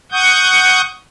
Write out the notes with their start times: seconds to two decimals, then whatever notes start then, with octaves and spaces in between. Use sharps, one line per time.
0.12 F#5 C#6 D#6 G6